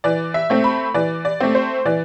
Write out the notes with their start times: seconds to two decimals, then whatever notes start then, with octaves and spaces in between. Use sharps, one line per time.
0.04 E3 D5
0.34 E5
0.50 A3 C4
0.64 B5
0.94 E3 D5
1.25 D5
1.41 A3 C4
1.55 C5
1.85 E3 D5